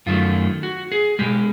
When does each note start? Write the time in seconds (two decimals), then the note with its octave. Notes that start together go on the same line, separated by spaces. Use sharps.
0.06 F#2 D#3 F#3 A3 F4
0.63 F#4
0.92 G#4
1.19 B2 G#3 G4